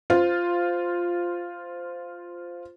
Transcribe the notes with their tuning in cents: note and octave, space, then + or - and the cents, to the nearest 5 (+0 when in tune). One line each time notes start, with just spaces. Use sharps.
F4 +0 C5 -10